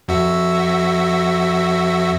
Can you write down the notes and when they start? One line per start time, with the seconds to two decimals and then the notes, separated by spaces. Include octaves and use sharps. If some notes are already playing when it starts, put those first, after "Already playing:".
0.08 F2 F#4 E5